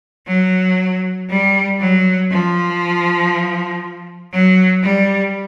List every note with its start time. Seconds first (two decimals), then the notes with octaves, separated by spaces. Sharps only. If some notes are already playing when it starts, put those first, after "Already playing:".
0.27 F#3
1.30 G3
1.80 F#3
2.31 F3
4.33 F#3
4.84 G3